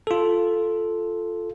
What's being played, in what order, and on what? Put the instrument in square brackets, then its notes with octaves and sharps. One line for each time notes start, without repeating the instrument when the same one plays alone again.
[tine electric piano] F4 A4